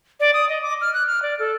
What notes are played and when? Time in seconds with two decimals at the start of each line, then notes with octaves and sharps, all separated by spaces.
0.20 D5
0.34 D#6
0.49 D#5
0.62 D6
0.81 F6
0.94 F#6
1.07 F6
1.22 D5
1.39 A4